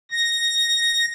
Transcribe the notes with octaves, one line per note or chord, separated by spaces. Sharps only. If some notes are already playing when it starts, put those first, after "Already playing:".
A#6